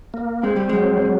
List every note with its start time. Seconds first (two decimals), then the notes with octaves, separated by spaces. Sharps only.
0.14 A#3
0.43 G#3 C4
0.56 G3
0.69 F#3 G#3
1.02 F#3